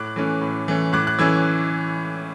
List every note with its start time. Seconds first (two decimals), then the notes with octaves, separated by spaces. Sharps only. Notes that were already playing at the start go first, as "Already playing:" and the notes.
Already playing: A2 D6 F#6
0.16 E3 A3 C#4
0.41 A2
0.68 E3 A3 C#4
0.93 A2 D6 F#6
1.07 F#6
1.19 E3 A3 C#4 E6 G#6